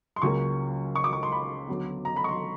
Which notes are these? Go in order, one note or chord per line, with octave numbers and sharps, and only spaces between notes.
C6
C#2 C#3 F#3 A#3 C#6
C#6
D6
C#6
C6
B5
D2 D3 F#3 B3
A#5
B5
C#6
C6